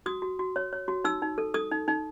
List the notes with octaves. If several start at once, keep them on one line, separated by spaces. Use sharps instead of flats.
F#4 D#6
F#4
F#4
C#5
C#5
F#4
D#4 E6
D#4
A4
A4 D#6
D#4
D#4